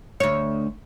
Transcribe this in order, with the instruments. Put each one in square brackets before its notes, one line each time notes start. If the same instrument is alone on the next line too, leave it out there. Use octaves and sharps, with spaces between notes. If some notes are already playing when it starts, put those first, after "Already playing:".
[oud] D2 C#5